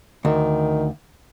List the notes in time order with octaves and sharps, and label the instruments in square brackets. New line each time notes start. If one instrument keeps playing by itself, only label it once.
[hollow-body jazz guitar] D2 [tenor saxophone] D#3